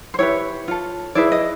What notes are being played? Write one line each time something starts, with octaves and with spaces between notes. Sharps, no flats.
C5
E4 G4 B4 C#5
F4 A4
E4 G#4 B4 D5
D#5